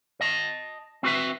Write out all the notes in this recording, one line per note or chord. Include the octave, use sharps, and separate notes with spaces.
D#5 A5
C4 F#4 B4 E5